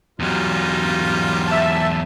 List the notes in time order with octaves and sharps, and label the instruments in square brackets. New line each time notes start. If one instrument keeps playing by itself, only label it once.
[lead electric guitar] E2 F#3 [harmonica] G3 D#4 F4
[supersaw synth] E5 A5